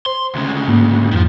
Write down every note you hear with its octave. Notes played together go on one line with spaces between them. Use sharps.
C5 C6
D2 C#3
G#2 A#3
F2 D#3 F3